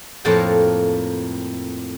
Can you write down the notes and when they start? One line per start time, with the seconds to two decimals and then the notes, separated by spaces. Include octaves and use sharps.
0.25 F2 A2 A#3 A4 F5 G5